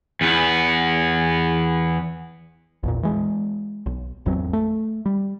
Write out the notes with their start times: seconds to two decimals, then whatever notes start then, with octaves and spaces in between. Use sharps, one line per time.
0.21 E2 B3
2.83 A#1 E2 A#2
3.03 E3 G#3
3.86 B1
4.26 G#1 E2 F#3 C4
4.53 A3
5.06 G3